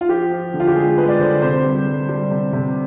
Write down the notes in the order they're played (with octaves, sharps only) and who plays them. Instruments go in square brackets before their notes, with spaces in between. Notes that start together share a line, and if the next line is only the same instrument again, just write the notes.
[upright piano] F4
F3 G4
F3
D3
F4
G4
G#3 G#4
G#3 B4
D5
D3 C5
C3 C5
G3
G3
G3
C3
C3